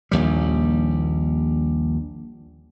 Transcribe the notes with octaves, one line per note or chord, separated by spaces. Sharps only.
A#1 D#2 G3